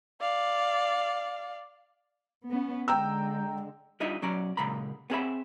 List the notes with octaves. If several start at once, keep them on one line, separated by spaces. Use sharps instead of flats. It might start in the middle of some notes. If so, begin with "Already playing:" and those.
D5 F5
B3 C#4
D3 G#3 G5 A#5 E6
G3 D4 D#4 F4 D#5 E5
B1 F#3 C#4 D5 A#5
A#2 C#3 G#3 A#5 B5
B3 C4 G#4 C#5 E5 B5